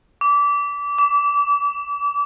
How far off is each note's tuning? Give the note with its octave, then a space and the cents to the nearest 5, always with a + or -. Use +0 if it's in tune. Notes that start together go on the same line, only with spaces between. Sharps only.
D6 -25
D6 -40